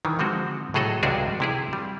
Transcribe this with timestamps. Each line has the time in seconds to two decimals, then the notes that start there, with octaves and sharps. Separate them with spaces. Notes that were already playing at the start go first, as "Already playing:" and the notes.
0.05 D#3 E3
0.19 D3 F3 G#3 C4 F#4
0.74 A2 F#3 G#4 A4 D#5 F#5
1.03 C#2 C3 G3 D4 F#4 G#4
1.40 C3 E4 G#4
1.73 G3